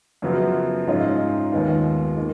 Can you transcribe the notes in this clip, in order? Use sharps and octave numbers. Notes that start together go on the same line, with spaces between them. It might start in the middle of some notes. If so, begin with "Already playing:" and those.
F#2 C#3 F3 B3 F#4
G#2 F3 G#3 C#4 F4
D#2 D#3 G#3 B3 F4
D#3 A#3